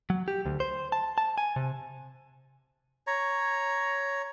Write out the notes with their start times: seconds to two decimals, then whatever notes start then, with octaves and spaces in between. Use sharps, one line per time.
0.10 F#3
0.28 G4
0.46 D2
0.60 C5
0.92 A5
1.18 A5
1.38 G#5
1.56 C3
3.07 C#5 A#5